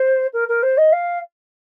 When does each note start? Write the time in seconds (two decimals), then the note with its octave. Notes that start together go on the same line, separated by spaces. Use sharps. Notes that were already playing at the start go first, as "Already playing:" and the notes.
Already playing: C5
0.33 A#4
0.48 A#4
0.63 C5
0.77 D#5
0.92 F5